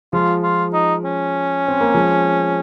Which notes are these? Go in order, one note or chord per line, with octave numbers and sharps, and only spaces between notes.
F3 G#3 F4
F4
D#4
C#4
C4
A#3
F3 G#3